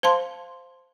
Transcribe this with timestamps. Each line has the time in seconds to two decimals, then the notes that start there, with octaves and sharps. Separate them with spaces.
0.03 C5 F5 A5 C6